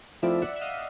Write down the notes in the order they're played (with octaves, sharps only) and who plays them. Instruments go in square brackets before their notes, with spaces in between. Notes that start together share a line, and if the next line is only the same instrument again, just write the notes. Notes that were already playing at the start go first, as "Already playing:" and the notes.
[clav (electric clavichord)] F3 A3 C4 E4 [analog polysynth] D5 E5
[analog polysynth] E5 F#5
E5
D#5 F5